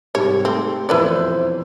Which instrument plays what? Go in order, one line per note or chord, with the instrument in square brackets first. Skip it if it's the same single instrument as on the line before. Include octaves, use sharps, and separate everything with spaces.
[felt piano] G#2 C3 G3 [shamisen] C#5
[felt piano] A3 G4 A4 [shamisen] C4
[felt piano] E1 F2 [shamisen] E4 B4 D5 [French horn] C5